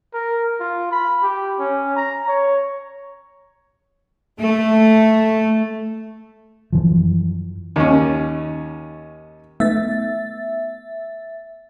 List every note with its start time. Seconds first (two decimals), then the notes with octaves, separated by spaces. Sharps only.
0.14 A#4
0.60 F4
0.91 B5
1.23 G4
1.59 C#4
1.96 A#5
2.28 C#5
4.39 A3
6.73 F#2 E3 F3
7.76 D#2 C#4
9.60 A3 B3 D#4 E5 A6